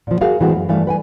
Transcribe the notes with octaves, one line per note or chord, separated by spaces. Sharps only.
A#2 F3
F#4 G#4 A#4 F5
A2 E3 G#3 A3 C4 F#4
F#2
G2 E3 A3 D5 F5
B4 G5 G#5